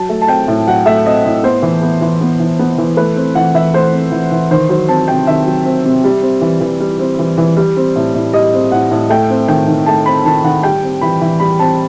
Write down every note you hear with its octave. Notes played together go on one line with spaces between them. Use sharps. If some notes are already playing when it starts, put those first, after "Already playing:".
Already playing: F#3 A5
A3
A5
C4 G5
A2
F#3 F#5
A3 E5
C4 D#5
A2 D#5
B3 C5
E3
B3
E3
B3
E3
B3
E3
A3 B4
C4
E3 F#5
E3 E5
A3 C5
C4
E3
E3
D#3 C5
F#3 C5
C4 A5
C3 G5
D#3 E5
F#3
C4
C3
G3
C4
E3
E3
G3
C4
E3
E3
G3
C4
A2
A2
G3 D#5
C4
A2 F#5
A2
A3 G5
C4
D#3 G5
D#3
A3 A5
C4 B5
D#3 A5
D#3 F#5
G3 G5
C4
E3 B5
E3
G3 B5
C4 A5